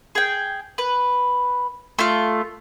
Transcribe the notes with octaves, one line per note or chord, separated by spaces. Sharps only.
G#4 G5
B4
A3 F4